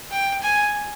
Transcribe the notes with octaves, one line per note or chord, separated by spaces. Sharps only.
G5
G#5